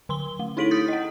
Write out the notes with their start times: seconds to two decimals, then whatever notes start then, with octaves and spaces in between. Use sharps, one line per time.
0.09 D3 C6 G7
0.39 A3
0.57 D#4 E4 A4 B6 D7 F#7
0.71 D#6 G6 A6
0.88 D#5 F#5